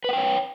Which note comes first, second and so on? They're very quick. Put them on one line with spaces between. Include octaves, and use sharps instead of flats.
B4 F#5 G5 C#5